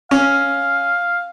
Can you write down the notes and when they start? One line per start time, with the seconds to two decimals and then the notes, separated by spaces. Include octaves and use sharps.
0.11 C#4 F5